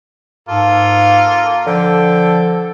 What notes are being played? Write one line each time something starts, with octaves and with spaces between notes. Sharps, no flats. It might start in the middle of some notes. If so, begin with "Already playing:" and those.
G#2 A#3 F4 A4
D3 F3 A4 G5